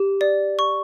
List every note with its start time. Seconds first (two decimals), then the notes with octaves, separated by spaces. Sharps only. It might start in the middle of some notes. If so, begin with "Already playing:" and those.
Already playing: G4
0.21 D5
0.59 C#6